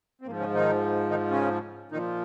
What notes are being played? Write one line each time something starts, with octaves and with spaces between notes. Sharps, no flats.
C4
G#2 F3 A#3
C#3 C#4
D#3 D#4
D#3 D#4
C#3 C#4
A#2 D#3 F3 D#4